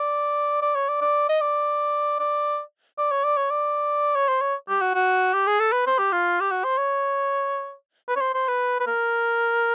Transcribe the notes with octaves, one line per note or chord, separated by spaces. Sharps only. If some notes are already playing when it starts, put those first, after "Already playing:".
Already playing: D5
D5
C#5
D5
D5
D#5
D5
D5
D5
C#5
D5
C#5
D5
C#5
C5
C#5
G4
F#4
F#4
G4
G#4
A4
B4
C5
G4
F4
G4
F#4
C5
C#5
B4
C#5
C5
C5
B4
B4
A#4